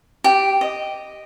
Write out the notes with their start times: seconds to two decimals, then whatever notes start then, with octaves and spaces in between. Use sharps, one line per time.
0.24 G4
0.61 D#5